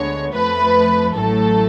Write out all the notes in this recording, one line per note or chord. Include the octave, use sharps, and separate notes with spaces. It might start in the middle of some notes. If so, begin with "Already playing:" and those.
Already playing: D2 D3 G#3 B3 C#5
F2 F3 A3 B4
A1 A2 F#3 A3 A4